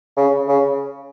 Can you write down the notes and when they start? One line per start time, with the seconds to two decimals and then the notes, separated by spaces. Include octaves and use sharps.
0.17 C#3
0.49 C#3